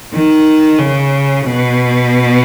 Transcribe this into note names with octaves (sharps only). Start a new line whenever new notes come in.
D#3
C#3
B2